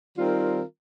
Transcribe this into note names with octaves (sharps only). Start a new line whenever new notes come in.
D#3 G3 C4 F4 A#4